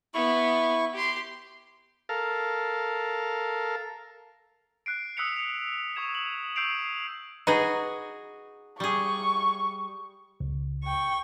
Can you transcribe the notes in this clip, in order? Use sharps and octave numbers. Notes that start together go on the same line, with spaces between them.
B3 E4 C#6
G4 C6
A4 A#4 F5
F#6 C7 D7
D#6 E6 F#6 B6 C#7 F7
C#7 F7
C#6 D#6 G#6 E7
F#7
C#6 E6 G6 C7 D7 F7
D#4 F#4 G#4 B4 D#5
G3 G#4 C#6
C#2
G5 C#6